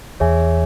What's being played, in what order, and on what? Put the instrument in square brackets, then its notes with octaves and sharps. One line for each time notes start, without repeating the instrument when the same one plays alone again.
[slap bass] E2 [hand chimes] G#4 C#5 E5 G#5